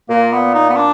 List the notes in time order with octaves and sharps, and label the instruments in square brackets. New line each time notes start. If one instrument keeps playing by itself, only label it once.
[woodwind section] A#2 [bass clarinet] A#3
[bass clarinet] B3
D#4
B3
D4